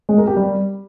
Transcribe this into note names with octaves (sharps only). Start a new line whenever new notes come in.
G#3
A#4
G4
G3